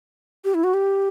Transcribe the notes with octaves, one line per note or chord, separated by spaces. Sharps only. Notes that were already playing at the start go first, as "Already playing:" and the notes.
G4
E4
F#4
G4